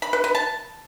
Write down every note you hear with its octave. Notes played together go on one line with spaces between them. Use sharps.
B5
B4
B4
A5